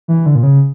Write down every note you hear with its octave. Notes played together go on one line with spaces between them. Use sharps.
E3
D3
A#2
C#3